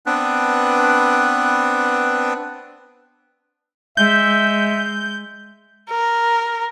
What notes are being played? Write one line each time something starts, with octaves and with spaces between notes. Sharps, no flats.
B3 C4 D4 B4
G#3 E5 G6
A#4